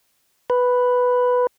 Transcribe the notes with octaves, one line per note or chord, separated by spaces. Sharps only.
B4